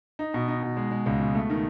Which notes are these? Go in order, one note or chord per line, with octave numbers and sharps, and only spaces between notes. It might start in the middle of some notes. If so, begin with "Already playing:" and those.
D#4
B2
D#4
B2
G#3
G#3
C#2
B2
A3
D#3